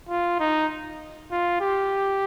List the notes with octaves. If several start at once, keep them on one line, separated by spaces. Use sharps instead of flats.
F4
D#4
F4
G4